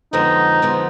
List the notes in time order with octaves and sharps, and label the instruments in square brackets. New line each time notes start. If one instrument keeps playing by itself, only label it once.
[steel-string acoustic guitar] F2 D3 F3 G#3 B3 [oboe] D#4
[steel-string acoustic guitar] F2 D3 F3 G#3 B3